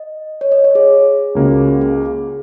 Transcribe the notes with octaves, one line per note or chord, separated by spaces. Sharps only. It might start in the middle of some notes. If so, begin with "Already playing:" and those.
Already playing: D#5
C#5
D#5
C#5
G#4
C#2 C#3 A#3 F#4
G#4